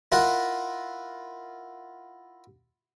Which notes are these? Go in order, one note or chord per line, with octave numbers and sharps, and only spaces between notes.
E4 F4 A#4 F#5